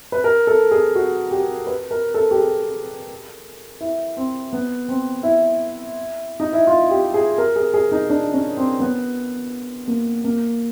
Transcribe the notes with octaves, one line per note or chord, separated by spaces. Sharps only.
B4
A#4
A4
G#4
F#4
G4
B4
A#4
A4
G4
G#4
E4
C4
B3
C4
E4
D#4
E4
F4
G4
G#4
A#4
G#4
G#4
D#4
D4
C#4
C4
B3
A#3
A#3